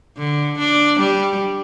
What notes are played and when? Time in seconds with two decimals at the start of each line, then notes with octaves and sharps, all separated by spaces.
0.18 D3
0.58 D4
1.00 G3